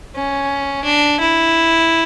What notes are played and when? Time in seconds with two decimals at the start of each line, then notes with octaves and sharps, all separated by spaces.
0.15 C#4
0.84 D4
1.20 E4